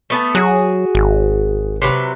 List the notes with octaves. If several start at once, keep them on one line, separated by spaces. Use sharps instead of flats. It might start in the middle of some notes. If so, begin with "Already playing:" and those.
A3 B3 A5
F#3 F#4 G#4
G#1
C3 F#3 B4